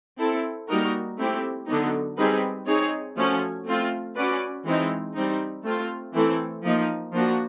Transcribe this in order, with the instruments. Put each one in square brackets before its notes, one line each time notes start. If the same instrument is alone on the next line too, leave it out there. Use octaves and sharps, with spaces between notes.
[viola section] C4 E4 A4
G3 A#3 D#4 F#4 A#4
A3 C4 E4 G4
D3 F#3 B3 D#4
G3 C4 D#4 G#4 B4
C4 D#4 G#4 C#5
F3 A3 C#4 F#4
A3 C4 F4
C#4 F#4 B4 D5
E3 G#3 C4 D#4
G3 C4 D#4
A3 C4 F4
E3 A3 C4 E4 A4
F3 A#3 D#4
F3 A#3 D4 F#4